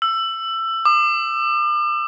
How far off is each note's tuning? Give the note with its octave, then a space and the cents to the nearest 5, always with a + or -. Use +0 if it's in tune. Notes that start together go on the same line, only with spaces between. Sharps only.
E6 +20
D6 +40